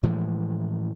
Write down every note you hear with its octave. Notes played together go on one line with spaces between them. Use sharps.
A2 E3 F3 G#3